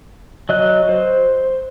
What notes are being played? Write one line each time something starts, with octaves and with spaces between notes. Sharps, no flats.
F#3 D#5 F#6
C5